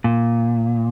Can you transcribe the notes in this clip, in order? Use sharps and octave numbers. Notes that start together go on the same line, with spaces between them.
A#2